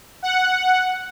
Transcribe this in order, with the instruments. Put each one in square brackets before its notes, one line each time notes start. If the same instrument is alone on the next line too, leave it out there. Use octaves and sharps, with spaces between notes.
[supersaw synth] F#5